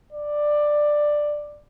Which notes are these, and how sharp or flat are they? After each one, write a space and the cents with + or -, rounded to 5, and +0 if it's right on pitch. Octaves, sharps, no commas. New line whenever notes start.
D5 +10